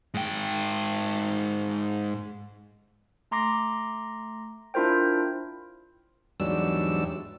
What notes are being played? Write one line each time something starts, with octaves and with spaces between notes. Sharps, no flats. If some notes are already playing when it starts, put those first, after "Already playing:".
G#2 G5
A3 A#5 C6 D6 A#6
D4 E4 F4 A#4 C5 G5
E2 G#2 F#3 G3 D4 E6